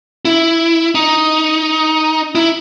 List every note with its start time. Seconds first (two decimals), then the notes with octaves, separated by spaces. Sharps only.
0.25 E4
0.95 D#4
2.35 E4